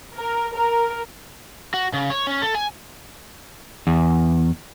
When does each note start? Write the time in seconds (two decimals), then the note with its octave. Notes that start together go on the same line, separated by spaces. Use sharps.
0.16 A#4
0.55 A#4
1.74 F#4
1.93 C#3
2.10 C#5
2.27 C#4
2.42 A4
2.55 G#5
3.87 E2